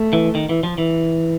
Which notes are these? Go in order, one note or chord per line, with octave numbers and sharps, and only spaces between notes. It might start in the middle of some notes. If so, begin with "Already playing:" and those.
Already playing: A3
E3
D#3
E3
F3
E3